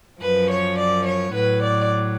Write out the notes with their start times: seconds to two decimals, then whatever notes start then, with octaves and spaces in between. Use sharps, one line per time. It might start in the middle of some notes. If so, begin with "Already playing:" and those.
0.20 F#2 F3 B4
0.49 C#5
0.76 D5
1.04 C#5
1.32 A2 F#3 B4
1.61 D5